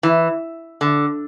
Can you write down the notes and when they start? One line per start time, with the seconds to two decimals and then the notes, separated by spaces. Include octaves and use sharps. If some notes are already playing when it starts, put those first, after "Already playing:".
0.03 E3
0.81 D3